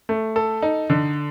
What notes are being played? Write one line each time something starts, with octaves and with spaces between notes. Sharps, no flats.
A3
A4
D#4
D3